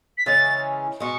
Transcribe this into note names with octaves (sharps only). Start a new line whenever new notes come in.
B6
C#3 E3 G#3 C#4 A6
B2 G#3 B3 C#6